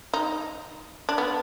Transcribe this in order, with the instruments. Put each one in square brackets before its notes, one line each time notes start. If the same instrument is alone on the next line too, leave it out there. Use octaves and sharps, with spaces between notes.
[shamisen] D#4
D4
B3